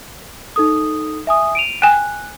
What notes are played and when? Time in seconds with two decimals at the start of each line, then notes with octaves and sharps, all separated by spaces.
0.56 D#4 A4 D#6
1.27 E5 G#5 D#6
1.55 D7 D#7 F7
1.82 G5 G#5 F#6